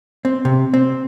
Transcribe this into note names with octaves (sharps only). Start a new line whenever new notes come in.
C4
C3
C4